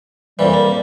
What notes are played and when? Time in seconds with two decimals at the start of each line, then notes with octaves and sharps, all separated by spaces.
0.39 F2 A#2 E3 G3
0.53 A#3